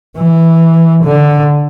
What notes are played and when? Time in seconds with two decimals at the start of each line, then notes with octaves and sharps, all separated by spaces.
0.17 E3
1.04 D3